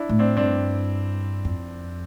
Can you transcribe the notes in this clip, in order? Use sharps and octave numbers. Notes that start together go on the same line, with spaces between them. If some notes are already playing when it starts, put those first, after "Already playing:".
Already playing: D4 E4
A2
C4 D4
G2 C4 D4
F2